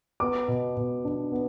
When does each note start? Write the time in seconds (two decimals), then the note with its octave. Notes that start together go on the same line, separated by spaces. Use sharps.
0.20 B3 D6
0.48 B2
0.77 B2
1.05 D4
1.32 B3